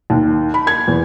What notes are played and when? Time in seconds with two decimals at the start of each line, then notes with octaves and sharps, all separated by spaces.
0.10 D#2
0.54 B5
0.67 G#6
0.88 E2